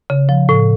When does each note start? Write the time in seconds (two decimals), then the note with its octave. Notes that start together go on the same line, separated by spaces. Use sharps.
0.10 C#3
0.29 F3
0.49 A2